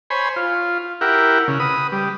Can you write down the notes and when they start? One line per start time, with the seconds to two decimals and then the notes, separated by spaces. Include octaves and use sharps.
0.10 C5 C#5 G#5 B5
0.36 F4
1.01 E4 G4 A#4 F#5
1.48 C#3
1.60 B4 D#6
1.92 G3